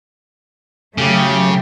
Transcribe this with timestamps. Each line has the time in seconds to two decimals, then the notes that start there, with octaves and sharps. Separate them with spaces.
0.98 C#3 F#3 A3 G4